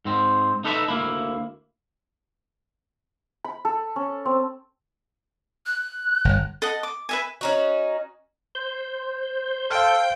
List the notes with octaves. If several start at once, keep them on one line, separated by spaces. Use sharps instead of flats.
G#2 C4
D#4 A4 B4 C#5 E5
D2 A#3 E4
B5
A4
C#4
C4
F#6
G1
A4 D#5 F#5
D6
B4 E5 G#5
C#4 D#4 F#4
C5 G6
A4 F5 G5 F6